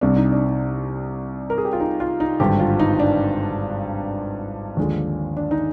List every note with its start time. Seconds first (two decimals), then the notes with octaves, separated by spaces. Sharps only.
0.01 C2 C3 G3 D4
0.16 D#4
0.32 D4
0.47 D4
1.50 A#4
1.58 G#4
1.65 G4
1.73 F4
1.80 D#4
2.00 F4
2.20 D#4
2.40 G#1 G2 D3 G4
2.60 F4
2.79 D#4
3.00 D4
4.77 D#2 D3 F3 G#3
5.37 D4
5.51 D#4